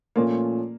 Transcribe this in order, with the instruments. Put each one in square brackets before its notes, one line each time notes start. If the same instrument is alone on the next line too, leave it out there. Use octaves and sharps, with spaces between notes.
[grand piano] A#2 F3 A3 C#4 F4 [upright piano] A#3